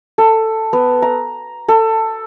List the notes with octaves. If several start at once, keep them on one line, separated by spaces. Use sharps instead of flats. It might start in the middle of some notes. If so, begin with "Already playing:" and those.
A4
B3
A#5
A4